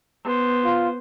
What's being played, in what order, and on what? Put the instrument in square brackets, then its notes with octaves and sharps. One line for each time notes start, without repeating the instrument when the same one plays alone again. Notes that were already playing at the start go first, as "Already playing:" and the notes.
[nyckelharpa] B3 C5
[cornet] F4